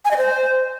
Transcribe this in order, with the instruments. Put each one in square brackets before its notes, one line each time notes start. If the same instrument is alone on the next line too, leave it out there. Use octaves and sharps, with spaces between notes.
[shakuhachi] G#5
D#5
C5